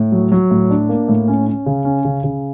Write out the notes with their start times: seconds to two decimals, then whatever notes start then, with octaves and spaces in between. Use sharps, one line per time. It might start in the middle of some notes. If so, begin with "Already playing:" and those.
Already playing: A2
0.12 F#3
0.32 F#3
0.51 A2
0.70 D4
0.89 A#3
1.08 A2
1.28 C#4
1.47 C#4
1.66 C#3
1.85 C#4
2.05 C#3
2.24 C#3